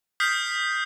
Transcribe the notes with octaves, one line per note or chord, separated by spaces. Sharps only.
D#6 F6 G6 B6 C7